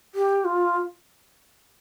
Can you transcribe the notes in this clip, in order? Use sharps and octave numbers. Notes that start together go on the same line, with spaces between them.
G4
F4